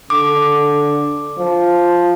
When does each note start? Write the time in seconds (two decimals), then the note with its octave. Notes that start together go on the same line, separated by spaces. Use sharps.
0.10 D3 D6
1.38 F3